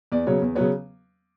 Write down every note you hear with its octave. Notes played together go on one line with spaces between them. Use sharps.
E2 D5
C#3 F#3 B3 C#5
E2
C#3 F#3 B3 C#5